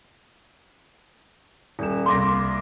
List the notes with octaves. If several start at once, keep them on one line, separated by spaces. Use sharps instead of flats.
D#1 E7
C2 A#3 C6 D6 A#6